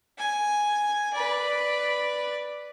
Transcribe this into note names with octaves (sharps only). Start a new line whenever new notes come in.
G#5
B4 D5